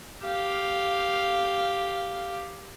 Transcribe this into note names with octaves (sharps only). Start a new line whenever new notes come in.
G4 F5